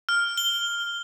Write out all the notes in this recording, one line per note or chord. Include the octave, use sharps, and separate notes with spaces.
F6
G7